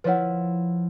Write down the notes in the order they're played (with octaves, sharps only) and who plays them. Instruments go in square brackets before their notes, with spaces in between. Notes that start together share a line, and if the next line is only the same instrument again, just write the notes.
[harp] F3 E4 [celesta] B4 C#5 F#5